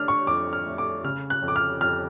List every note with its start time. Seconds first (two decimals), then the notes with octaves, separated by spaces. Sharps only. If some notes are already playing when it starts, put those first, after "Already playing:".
Already playing: A3 D4 F6
0.08 C#6
0.27 F2 D6
0.53 F6
0.66 A3
0.78 D6
1.04 C#3 F6
1.30 F#6
1.42 F2
1.48 D6
1.56 F6
1.80 F2 F6